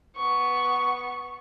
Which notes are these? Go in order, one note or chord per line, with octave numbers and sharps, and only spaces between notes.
B3 C#6